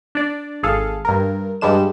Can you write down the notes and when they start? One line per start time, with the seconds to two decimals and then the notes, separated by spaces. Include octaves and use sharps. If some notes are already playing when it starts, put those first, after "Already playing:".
0.15 D4 D5
0.63 G#1 G#4 A4 F5
1.05 G2 A#4
1.61 G2 G3 G#3 D4 E7